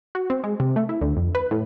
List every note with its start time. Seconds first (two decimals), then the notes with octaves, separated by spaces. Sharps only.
0.15 F#4
0.30 C4
0.44 G#3
0.60 C3
0.76 A3
0.89 E4
1.01 D2
1.17 F2
1.35 B4
1.51 A2